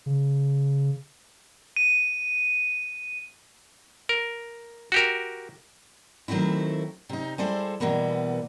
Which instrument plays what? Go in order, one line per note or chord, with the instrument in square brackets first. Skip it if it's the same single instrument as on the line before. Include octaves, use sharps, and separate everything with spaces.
[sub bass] C#3
[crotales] D#7
[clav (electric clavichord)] A#4
F#4 G4 A#4
[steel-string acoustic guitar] D#3 F#3 A3 C4 E4
C3 D#4
G3 G#3 E4 G#4 A4 C5
B2 E3 G3 A#3 B3